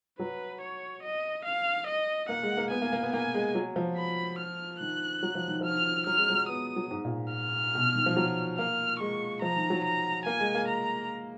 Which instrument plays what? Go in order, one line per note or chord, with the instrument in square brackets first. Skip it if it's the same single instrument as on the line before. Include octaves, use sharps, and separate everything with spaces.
[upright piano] F#3 [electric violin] B4
[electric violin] C#5
D#5
F5
D#5
[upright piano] A#3 [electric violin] F#5
[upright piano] G#3
A#3
[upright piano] B3 [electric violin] G#5
[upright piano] A#3
A#3
B3
[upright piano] A#3 [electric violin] G#5
[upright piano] G#3
F#3
F3
[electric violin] B5
F6
[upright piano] D#3 [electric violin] F#6
[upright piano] F#3
F3
D#3
[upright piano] F3 [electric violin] F6
[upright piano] F#3 [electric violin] F6
[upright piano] G#3
F#3
[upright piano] B3 [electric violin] D#6
[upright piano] F#3
G#2
A#2
[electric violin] F6
[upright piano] B2
D#3
F3
F#3
[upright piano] A#3 [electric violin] F6
[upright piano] G#3 [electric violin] C#6
[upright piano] F3 [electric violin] A#5
[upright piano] D#3
F#3
[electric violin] A#5
[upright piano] A#3 [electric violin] G#5
[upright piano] G#3
A#3
[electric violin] A#5